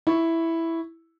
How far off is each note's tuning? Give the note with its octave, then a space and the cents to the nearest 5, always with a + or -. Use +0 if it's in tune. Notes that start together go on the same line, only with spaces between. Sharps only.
E4 +0 C#6 +0